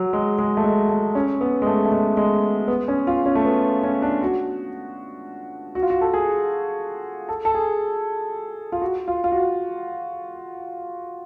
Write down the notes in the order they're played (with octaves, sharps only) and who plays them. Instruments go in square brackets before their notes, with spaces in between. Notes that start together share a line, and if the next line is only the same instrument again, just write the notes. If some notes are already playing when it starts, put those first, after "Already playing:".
Already playing: [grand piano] F#3
G#3
G#3
A3
G#3
A3
C#4
B3
G#3
A3
A3
G#3
G#3
B3
C#4
F4
C#4
A3
B3
C#4
D4
F#4
F#4
F4
F#4
A4
G#4
A4
A4
G#4
F4
F#4
F4
F4
F#4